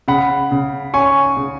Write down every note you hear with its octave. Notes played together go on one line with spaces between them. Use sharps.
C#3 F#5 B5
C#3
C#4 G#5 C#6
C#3